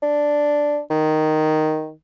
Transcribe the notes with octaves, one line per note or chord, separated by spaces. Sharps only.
D4
D#3